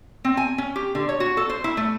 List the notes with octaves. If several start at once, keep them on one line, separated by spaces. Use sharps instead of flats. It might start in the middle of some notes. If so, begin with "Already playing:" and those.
C4
G#5
C#4
G4
D3
C#5
F#4
A4
C5
E4
A3